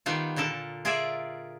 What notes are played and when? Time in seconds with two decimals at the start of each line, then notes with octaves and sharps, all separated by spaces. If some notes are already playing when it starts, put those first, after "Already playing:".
0.06 D#3 G3 B3 D#4 F4
0.36 A#2 D3 A4 A#4 A5
0.85 F4 G#4 A#4 D5 E5